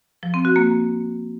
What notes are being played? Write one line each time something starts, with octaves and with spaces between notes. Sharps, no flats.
F3
C4
F#4
A#3